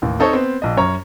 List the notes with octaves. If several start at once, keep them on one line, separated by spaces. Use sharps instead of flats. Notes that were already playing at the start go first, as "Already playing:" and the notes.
A1 D#2
C4 D#4 A4 C5 C#5
B3 C4 C5
A#1 D#5
F#2 C#5 A#5